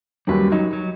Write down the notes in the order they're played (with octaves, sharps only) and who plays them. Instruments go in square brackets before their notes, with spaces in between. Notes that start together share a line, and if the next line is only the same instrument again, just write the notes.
[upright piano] D#2 F#3 C#4 [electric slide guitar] G3 B4
[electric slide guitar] F#3 [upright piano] D#4
[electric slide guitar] F#3